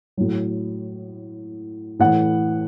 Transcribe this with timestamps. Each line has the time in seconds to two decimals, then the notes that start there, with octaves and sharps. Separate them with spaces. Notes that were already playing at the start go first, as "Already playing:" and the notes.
0.17 A2 F#3
1.99 A2 E3 F#5